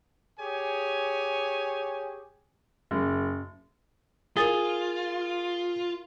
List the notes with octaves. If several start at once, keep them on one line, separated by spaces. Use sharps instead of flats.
G4 G#4 C#5 G#5
F#1
F4 G#4 A#4 A6 G7